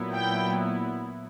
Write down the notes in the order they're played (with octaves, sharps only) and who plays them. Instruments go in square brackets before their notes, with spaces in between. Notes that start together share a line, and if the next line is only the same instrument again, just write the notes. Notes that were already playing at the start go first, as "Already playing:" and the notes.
Already playing: [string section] A#2 F#3 B3 E4
G5